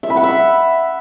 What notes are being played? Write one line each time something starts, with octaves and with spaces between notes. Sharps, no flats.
E5
B5
F#5
E5